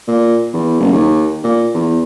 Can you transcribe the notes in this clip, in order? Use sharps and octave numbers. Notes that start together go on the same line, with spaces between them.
A#2
E2
F#1
D#2
A#2
E2